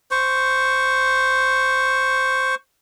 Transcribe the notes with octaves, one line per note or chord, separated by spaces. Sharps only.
C5 C#6